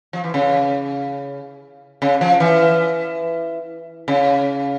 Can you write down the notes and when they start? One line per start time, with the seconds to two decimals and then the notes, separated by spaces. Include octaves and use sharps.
0.13 F3
0.24 E3
0.34 C#3
2.02 C#3
2.21 F3
2.40 E3
4.08 C#3